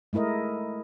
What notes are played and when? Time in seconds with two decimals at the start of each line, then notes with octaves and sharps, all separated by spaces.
0.13 G#3 A3 E4 A#4 D#5